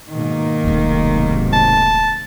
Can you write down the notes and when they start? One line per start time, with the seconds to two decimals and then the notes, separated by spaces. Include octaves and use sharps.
0.12 G#2 B2 D#3 A#3
0.64 D#1 B1 G#2 C3 A3
1.53 A5